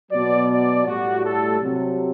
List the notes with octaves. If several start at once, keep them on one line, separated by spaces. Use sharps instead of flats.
B2 F#3 D5
D5
A2 G3 F#4
A4
C3 F#3